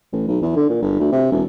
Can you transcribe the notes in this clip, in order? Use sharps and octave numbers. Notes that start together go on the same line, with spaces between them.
A1
B1
E2
D3
A#2
G1
D2
C3
E1